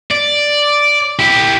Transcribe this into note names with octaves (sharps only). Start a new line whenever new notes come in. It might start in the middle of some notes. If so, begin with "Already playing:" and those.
D5
E4 G4